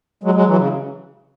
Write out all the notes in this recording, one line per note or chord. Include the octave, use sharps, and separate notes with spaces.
F#3 G#3
F#3 G#3
E3 F#3
C#3